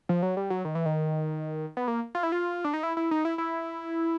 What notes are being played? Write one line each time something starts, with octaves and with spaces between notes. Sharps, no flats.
F3
F#3
G3
F#3
D#3
E3
D#3
B3
A#3
F4
E4
F4
D4
D#4
E4
E4
D#4
E4
E4